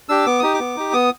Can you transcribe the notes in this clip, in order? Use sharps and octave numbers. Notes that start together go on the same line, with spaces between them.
D4 G4 E6
B3 D6
D#4 G4 D#6
D6
B3
D#4 G4
B3 D#6